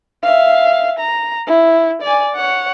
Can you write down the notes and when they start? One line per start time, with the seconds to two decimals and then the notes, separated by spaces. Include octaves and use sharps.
0.23 E5 F5
1.00 A#5
1.46 E4
2.02 D5 G#5
2.36 C#5 F#5